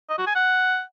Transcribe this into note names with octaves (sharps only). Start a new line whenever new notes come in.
D#5
F#4
G#5
F#5